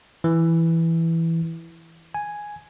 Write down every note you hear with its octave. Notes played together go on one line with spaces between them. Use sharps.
E3
G#5